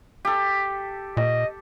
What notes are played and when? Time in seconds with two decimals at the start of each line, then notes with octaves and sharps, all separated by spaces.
0.25 G4 A4
1.17 A#2 D#5